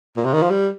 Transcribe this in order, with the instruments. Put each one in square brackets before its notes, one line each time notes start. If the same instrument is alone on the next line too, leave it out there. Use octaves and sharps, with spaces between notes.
[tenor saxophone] A#2
C3
D#3
F3
G3